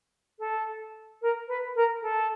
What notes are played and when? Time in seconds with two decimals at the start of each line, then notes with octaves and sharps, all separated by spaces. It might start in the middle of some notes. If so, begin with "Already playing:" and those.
0.39 A4
1.22 A#4
1.48 B4
1.75 A#4
2.02 A4